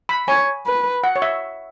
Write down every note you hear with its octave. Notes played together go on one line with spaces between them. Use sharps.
B5
C#5 G#5
B4
F#5
C#5
E5